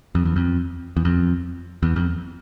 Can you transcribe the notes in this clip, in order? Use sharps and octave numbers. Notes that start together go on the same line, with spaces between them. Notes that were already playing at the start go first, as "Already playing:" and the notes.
F2
E2
F2
E2
F2
E2
F2